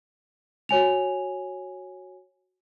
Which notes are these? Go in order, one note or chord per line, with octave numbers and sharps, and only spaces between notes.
F#4 C#5 G#5 F7